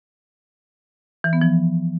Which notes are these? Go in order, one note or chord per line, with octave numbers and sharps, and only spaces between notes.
E3
B3
F3